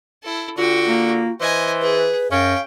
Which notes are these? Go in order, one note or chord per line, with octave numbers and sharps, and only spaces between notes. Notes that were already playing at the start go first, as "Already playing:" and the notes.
E4 A4
D3 F4 F#4 G5
A#3
E3 C5 D#5 G#5
G#4 B4
F#2 C#4 F5 G5